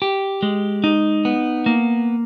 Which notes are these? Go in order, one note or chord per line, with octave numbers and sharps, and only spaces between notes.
G4
G#3
D#4
B3
A#3